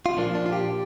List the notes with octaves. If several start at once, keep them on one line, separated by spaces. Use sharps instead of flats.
F4
A#2 F3 A#3 D4
D4
F4
G4